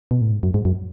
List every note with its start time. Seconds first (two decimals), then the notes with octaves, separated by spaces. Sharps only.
0.11 B2
0.21 A2
0.32 G#2
0.43 F#2
0.54 G#2
0.65 F#2